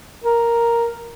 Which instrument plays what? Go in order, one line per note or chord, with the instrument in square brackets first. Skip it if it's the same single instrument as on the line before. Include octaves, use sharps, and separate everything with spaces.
[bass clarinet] A#4